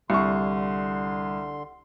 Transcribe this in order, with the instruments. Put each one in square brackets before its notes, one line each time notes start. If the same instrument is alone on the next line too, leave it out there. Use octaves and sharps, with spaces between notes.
[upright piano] C2 C#6 [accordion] D3 C6